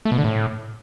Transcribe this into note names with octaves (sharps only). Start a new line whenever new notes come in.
A3
B2
D3
A2